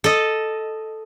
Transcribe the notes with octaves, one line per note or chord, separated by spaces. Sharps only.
A4 D#5